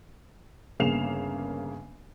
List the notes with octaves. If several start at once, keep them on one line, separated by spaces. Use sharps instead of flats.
G1 C#3 A#3 C7 E7 F7